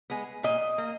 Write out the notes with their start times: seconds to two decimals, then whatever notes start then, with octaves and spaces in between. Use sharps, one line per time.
0.10 G#3 B3
0.43 A#2 D#5
0.78 A#3